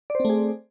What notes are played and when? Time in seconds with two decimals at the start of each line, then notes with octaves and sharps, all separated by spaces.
0.10 D5
0.15 C5
0.20 C4
0.25 A3
0.30 G#4